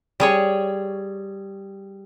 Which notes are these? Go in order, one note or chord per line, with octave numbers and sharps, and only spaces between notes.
G3 G#4 C#5